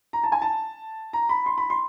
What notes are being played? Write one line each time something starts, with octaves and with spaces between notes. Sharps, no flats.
A#5
A5
G#5
A5
A#5
B5
C6
B5
C6